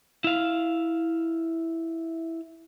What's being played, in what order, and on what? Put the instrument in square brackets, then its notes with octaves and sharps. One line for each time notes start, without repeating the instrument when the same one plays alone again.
[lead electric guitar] E4 F5